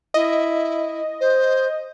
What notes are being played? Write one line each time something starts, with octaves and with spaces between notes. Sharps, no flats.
E4 D#5
C5